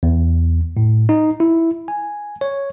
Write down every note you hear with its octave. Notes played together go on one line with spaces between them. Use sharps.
E2
A2
D#4
E4
G#5
C#5